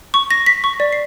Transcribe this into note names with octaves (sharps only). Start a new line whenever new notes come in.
C#6
A#6
B6
C#6
D5
C7